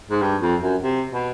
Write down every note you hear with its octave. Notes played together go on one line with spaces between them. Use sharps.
G#2
G2
F2
F#2
C3
B2